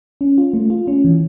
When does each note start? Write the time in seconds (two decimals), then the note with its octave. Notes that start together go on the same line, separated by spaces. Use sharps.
0.21 C#4
0.38 F4
0.53 A3
0.70 F4
0.88 C#4
1.05 E3